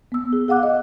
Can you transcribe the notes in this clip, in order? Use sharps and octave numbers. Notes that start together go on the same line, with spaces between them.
B3 E6
G#4
G#4 F5 F#5 D6 F#6
D#5